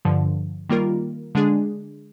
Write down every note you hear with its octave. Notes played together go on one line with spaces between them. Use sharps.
G2 D3 F3
D#3 G3 A#3 F4 A#4
D3 G#3 D4 G#4